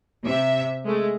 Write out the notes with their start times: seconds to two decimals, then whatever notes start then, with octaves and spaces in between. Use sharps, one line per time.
0.23 C3 E5
0.85 G#3 A3